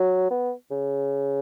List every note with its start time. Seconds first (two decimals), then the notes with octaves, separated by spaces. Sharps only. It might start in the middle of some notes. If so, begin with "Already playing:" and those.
Already playing: F#3
0.31 B3
0.71 C#3